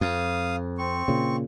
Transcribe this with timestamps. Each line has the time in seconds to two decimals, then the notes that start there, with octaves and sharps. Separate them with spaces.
0.01 F2 F5 D#6
0.78 C4 C#6
1.08 A#2 C#3